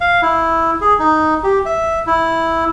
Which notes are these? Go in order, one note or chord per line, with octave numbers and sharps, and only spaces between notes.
F5
E4
G#4
D#4
G4
E5
E4